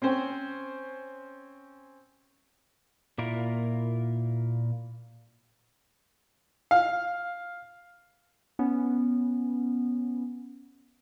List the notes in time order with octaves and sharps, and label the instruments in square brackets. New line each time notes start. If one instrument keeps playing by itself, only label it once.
[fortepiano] C4 C#4 C5 G5
[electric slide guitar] A#2 A#3 E4 F4 A#4
[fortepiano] F5
[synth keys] B3 C#4